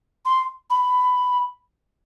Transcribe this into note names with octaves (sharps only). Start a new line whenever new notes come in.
C6
B5